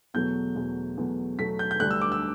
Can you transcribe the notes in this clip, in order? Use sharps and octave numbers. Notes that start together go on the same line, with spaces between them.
E2 B2 F#3 A3 G6
E2 B2 F#3 A3
E2 B2 F#3 A3
E2 B2 F#3 A3 B6
G6
G6
D2 D3 G3 D4 F#6
E6
D6
E6